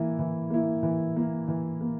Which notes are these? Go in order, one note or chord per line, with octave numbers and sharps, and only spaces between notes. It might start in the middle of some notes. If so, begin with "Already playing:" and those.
Already playing: E3 A#3 E4
E3
A#3 E4
E3
A#3 E4
E3
A#3